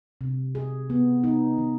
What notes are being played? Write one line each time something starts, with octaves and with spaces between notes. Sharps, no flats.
C3
G#4
B3
D#4
D#3